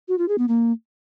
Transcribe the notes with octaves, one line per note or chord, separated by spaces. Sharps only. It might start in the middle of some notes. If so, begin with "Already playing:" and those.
F#4
F4
G#4
B3
A#3